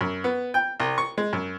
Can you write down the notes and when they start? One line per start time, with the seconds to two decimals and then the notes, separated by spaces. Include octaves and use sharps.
0.01 F#2
0.24 B3
0.54 G5
0.80 C2
0.98 C#6
1.18 G#3
1.33 F#2